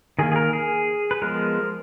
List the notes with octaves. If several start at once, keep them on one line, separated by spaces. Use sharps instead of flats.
D#3 A#3 G#4
G#4
A#4
G#4
B4
F3 G#3 B3 A#4